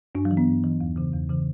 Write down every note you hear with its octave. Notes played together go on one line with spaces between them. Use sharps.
G2 D4
F#3
E3
B3
G2
E3
E2
C#3 E3
E2
C#3 E3